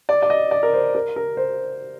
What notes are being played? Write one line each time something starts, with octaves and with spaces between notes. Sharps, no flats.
D5
D5
D#5
D5
A#4
C5
A#4
A#4
C5